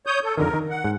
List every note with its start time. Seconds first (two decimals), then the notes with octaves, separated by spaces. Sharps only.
0.06 C#5 D#6 G6
0.24 A4
0.38 F2 D3 D#3 A#4
0.54 D#3
0.70 F#5
0.84 G#2